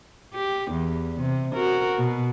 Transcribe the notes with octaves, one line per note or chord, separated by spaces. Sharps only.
G4
E2
C3
F#4 A#4
B2